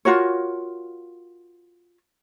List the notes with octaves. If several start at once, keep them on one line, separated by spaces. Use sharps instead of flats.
F4 F#4 A#4 C#5